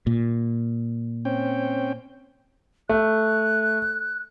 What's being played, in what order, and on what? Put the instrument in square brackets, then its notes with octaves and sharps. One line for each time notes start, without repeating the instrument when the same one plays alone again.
[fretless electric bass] A#2
[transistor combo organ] C4 C#4 G5
[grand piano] A3 [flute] F#6